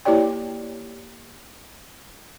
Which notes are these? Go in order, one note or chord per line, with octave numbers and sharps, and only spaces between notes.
A#3 E4 G4 C#5 D5 G5